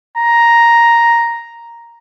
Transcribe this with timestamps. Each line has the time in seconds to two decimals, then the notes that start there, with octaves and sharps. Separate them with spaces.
0.18 A#5